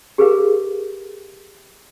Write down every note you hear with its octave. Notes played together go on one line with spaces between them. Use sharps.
G4 G#4 A#4 B4 F5